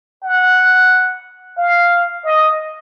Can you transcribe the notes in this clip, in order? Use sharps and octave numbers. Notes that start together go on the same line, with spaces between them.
F#5
F5
D#5